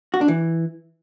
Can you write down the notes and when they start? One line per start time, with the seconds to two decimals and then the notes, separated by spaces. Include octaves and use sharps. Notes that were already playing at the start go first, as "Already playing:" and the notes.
0.14 F#4
0.21 D4
0.28 E3